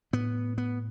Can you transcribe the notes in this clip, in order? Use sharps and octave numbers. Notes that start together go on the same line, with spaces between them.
A2 B3
B3